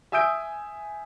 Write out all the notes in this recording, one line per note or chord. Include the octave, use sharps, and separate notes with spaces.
E5 G#5 D#6 E6 G6 D7